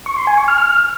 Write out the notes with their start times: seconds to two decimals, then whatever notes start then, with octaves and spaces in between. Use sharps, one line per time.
0.06 C#6
0.17 C6
0.27 G#5
0.38 C#6
0.48 F6